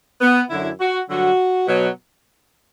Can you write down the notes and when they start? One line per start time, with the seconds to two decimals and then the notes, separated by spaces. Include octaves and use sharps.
0.21 B3
0.49 F#2 D3 F#3 E4
0.80 F#4
1.08 G2 D3 F#3 F#4
1.67 B2 F#3